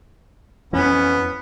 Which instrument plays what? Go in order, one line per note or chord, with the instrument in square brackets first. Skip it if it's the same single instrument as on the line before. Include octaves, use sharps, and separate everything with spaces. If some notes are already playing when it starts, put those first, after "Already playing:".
[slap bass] F2 E3 [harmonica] B3 [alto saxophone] C#4